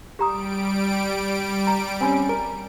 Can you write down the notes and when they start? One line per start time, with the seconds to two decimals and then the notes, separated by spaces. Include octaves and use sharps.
0.19 G3 G4 A#5 D#6 D7
1.67 A#5
2.01 C4 C#4 G#5 B5
2.29 A#4